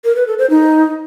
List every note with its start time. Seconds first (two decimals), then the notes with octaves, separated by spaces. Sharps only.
0.05 A#4
0.16 B4
0.27 A4
0.39 C5
0.50 D#4